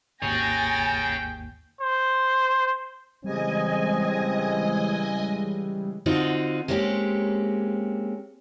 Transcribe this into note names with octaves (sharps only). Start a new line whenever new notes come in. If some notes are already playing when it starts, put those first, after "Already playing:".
G#1 D#2 G#4 C#5 G5 G#5 A6 A#6
C5
C#3 E3 G3 G#3 C4 D#5 G#5
D3 C4 D#4 F4 F#4
G#3 A#3 C4 C#4 G4